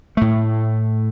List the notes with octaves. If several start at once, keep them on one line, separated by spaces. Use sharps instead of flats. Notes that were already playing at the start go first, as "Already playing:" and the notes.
A2 A3